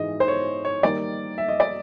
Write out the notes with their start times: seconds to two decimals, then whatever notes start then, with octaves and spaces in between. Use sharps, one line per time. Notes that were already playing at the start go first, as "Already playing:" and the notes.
Already playing: G#2 E3 G#3 D#5
0.20 C5
0.28 C#5
0.65 C#5
0.83 D#3 G3 A#3 D#4 D5
1.38 E5
1.48 D#5
1.60 D5